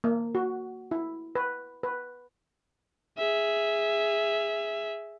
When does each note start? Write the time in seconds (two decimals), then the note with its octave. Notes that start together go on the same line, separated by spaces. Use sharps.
0.04 A#3
0.35 F#4
0.91 E4
1.35 B4
1.83 B4
3.18 G#4 E5